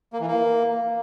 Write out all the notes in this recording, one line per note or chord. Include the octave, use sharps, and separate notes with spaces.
A#3
E3
A#3